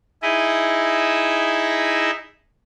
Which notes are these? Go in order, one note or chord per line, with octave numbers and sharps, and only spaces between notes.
D#4 E4 G#4 D#5 E5